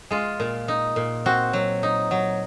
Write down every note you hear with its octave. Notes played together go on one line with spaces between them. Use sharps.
G#3 F4
A#2
D#4
A#2
C4 F#4
F#3
D#4
F#3